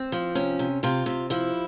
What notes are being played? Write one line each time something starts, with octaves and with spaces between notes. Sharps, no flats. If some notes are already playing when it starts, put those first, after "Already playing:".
Already playing: C4
F3
C3 C#4
C3
C3 F4
C3
F3 E4